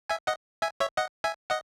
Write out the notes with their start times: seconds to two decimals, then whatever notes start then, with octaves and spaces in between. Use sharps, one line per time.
0.09 E5 G#5
0.27 D#5 F#5
0.62 E5 G#5
0.80 C#5 E5
0.97 D#5 F#5
1.24 E5 G#5
1.50 D#5 F#5